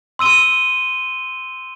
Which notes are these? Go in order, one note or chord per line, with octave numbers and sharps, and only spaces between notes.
C6 E6 D#7 G7